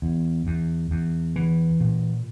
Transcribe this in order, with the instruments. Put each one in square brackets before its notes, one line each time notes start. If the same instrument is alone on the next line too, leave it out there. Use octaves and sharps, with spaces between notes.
[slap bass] E2
E2
E2
E3
A#2